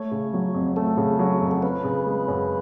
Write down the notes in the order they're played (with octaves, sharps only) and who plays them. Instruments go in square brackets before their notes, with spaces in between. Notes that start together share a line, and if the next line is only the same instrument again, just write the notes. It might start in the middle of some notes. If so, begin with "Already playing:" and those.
Already playing: [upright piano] A3 [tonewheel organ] C#5
[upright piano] C#3
F#3
F2
[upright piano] A3 [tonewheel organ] A4
[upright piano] C#3
F#3
F2
[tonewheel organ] A4
[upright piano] C#4 [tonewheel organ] B4
[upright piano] C#3
G#3
F#2